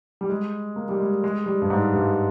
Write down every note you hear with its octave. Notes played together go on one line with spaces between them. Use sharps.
G3
G#3
A#3
G3
G#3
G#3
G3
G2
G#2
G2